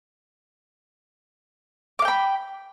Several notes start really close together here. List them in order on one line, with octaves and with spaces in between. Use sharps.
D6 F5 G5 B5